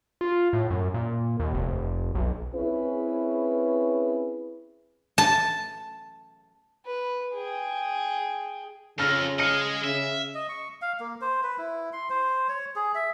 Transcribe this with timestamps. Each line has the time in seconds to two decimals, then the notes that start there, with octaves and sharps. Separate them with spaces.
0.21 F4
0.53 A2
0.70 F#2
0.94 A#2
1.40 D#2
1.54 F1
2.15 B1
2.55 C4 C#4 E4 G#4 B4
5.18 A5
6.86 B4
7.34 G#4 G5
8.99 F2 C#3 E6 F6 A#6
9.39 G#4 D#5 F6 C#7 F#7
9.84 C#3 E5
10.35 D#5
10.49 C#6
10.82 F5
11.00 A#3
11.21 C5
11.43 B4
11.58 E4
11.93 C6
12.10 C5
12.49 C#5
12.76 G#4
12.95 E5